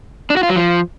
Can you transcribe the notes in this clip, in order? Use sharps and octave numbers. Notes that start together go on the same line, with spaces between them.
D4
F#4
F4
F#3
F3